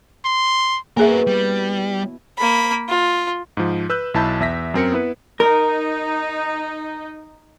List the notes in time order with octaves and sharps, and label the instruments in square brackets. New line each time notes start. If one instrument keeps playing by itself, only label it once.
[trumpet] C6
[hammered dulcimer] B2 E4 [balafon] A#3 G#4 E5 [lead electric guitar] F#4 A#4
[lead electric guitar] G3
[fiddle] A#3 B5
F4
[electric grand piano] G#2 F3
B4 E6 F#6 G6
B1 E4 A5 B5 G6
E2 E5 A#6 B6
F#2 C4 A#4 C#7
B3 E4 B4
[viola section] D#4 [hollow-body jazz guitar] A#4